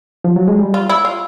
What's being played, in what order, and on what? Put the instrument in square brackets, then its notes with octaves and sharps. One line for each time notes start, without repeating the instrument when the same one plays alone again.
[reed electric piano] F3
F#3
G#3
G3
[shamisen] F4
E4
F4